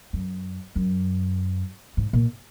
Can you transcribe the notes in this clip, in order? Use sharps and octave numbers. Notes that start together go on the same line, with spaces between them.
F#2
F#2
G#2
A#2